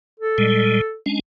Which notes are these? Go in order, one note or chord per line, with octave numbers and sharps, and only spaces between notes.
A4
A#2 G3 G#3
G#3 C#4 D4